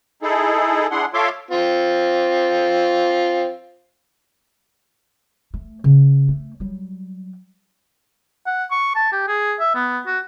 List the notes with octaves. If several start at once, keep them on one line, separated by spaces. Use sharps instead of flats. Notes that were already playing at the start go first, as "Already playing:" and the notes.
D#4 E4 G#4 A4
D4 E4 G#4 F#5 C6
F4 A4 C#5 E5 C6 D6
C4 F4
A3
C#3
A3
F#3 G3
F#5
C#6
A5
G4
G#4
E5
B3
F#4